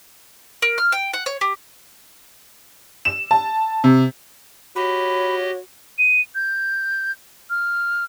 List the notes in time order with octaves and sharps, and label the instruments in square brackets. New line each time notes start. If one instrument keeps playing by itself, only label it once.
[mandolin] A#4
F6
G5
F#5
C#5
G4
[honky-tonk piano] E7
A5
C3
[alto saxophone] F#4 [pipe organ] G4 D#5 [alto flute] C#5 [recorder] B5
[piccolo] D#7
G6
F6